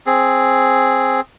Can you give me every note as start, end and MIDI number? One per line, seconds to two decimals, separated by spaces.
0.06 1.21 60
0.06 1.21 68